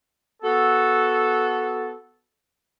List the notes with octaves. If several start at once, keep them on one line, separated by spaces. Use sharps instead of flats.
B3 F#4 A4